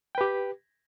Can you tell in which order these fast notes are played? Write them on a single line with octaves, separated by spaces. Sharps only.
G5 B4 G4